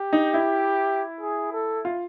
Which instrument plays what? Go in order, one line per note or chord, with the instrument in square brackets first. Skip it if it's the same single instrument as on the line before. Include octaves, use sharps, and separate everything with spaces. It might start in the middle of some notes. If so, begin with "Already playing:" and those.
Already playing: [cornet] G4
[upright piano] D#4
E4
[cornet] G#4
A4
[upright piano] F4